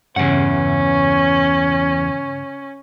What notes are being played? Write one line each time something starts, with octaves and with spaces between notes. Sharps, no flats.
E2 G2 C#3 C#4 F#5